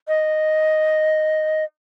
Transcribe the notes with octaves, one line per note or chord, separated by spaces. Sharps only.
D#5